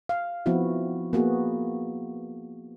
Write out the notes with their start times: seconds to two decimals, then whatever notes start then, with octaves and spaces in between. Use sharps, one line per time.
0.09 F5
0.46 F3 B3 C4 E4 F#4
1.13 A#3 B3 F#4 G#4